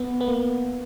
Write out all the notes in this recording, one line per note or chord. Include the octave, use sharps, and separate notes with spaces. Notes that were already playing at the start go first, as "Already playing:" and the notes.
Already playing: B3
B3
A#3